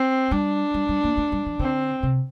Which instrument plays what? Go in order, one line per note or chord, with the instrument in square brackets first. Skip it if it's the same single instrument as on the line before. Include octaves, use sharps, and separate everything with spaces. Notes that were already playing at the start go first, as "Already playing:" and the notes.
Already playing: [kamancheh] C4
[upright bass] G3 [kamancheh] D4
[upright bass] G3
G3
A#3
A3
G3
F3
[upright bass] D3 [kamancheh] C4
[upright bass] C3